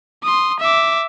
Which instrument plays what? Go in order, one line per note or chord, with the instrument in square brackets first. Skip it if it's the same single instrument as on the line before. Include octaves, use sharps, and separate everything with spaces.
[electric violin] C6 D#6
E5 D6